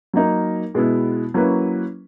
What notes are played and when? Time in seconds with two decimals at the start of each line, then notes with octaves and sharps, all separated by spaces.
0.14 F#3 A#3 D#4 A#4
0.75 B2 G#3 B3 E4
1.34 F#3 A#3 C#4 E4 B4